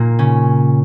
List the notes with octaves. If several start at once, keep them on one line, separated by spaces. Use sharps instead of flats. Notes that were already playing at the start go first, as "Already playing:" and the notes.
Already playing: A#2 A#3
C#3 C#4